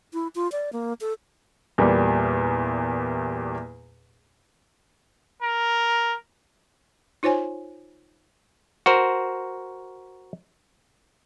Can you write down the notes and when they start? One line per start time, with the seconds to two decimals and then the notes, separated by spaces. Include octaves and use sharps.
0.13 E4
0.35 F4
0.52 D5
0.73 A#3
1.01 A4
1.78 E2 A#2 G3 A#3
5.42 A#4
7.23 D#4 F4 C5 C#5 G#5
8.86 F#4 A#4 C5